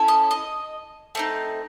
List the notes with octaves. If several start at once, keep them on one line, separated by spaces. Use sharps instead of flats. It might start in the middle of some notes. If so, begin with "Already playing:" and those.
Already playing: C#4 E4 A4
D#5
D#5
A3 C4 D#4